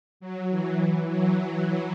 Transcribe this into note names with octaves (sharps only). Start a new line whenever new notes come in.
F#3
E3
F#3